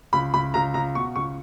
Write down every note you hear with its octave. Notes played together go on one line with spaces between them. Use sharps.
C#2 B5
C#2 B5
C#2 A#5
C#2 A#5
B2 C#6
C#2 C#6